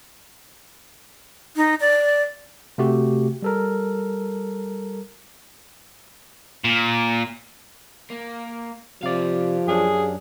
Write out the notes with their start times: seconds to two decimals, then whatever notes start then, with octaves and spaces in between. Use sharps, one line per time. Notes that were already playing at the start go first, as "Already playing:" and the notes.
1.56 D#4
1.80 D5
2.78 C3 A3 F#4 G4
3.42 G3 A4 A#4
6.64 A#2
8.10 A#3
9.03 C3 F3 G4 D5 F5
9.68 F#2 C#4 D4 G#4